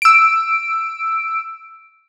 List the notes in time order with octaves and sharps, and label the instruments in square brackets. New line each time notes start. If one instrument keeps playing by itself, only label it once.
[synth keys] E6 D7